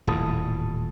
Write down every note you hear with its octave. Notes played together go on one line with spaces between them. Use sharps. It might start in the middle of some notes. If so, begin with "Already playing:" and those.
D#1 E2 A2 A5 D#6